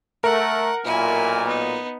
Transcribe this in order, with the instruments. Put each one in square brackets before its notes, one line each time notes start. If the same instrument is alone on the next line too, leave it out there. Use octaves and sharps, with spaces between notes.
[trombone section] A3 [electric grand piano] A#4 [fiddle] F#5
[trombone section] B1 A#2 [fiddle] E4 G#5
[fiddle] B3 D#4